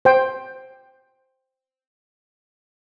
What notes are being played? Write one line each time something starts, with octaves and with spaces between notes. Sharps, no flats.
C5 G5